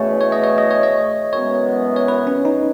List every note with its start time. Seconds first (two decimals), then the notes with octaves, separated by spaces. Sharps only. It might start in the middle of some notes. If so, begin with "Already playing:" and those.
Already playing: E2 B2 A3 C#4 C#5
0.21 C#5
0.32 D#5
0.44 C#5
0.58 D#5
0.71 C#5
0.83 D#5
1.33 F#2 E3 G#3 B3 C#5
1.96 C#5
2.08 B4
2.27 C#4
2.45 D#4